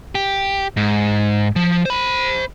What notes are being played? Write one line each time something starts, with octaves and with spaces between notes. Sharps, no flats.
G4
G#2
F3
C5 B5